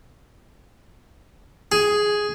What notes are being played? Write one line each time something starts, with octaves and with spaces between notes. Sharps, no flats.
G#4